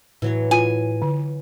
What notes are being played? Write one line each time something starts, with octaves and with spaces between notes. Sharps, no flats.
A2 E3 F#3 C#5
F4 G#5
D3